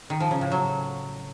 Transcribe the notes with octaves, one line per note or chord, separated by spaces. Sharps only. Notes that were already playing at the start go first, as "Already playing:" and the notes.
D#3
F3
C#3
A2
F#3